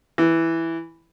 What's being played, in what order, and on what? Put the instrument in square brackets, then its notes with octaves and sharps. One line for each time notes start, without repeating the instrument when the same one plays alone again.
[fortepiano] E3